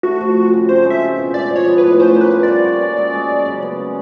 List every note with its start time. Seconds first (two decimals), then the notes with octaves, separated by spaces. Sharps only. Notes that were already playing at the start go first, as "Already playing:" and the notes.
0.03 A3 F#4
0.21 F3
0.37 C4
0.53 C#3
0.69 C4 C5
0.85 G#3
0.90 E5
1.02 F4
1.18 B2
1.34 G#3 D5
1.50 F3
1.56 C#5
1.67 B3
1.78 A2 B4
2.00 C#4 C5
2.16 A#3
2.21 B4
2.32 F4
2.43 D5
2.48 G3
2.64 F#4
2.81 C#4
2.98 G#3
3.13 G#3
3.30 F#3
3.46 C#3
3.62 B3